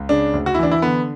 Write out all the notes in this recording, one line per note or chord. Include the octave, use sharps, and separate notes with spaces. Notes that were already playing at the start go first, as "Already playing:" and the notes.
Already playing: C#2
C#3 D4
D2
F#4
E4
E3 D4
E4
D3 B3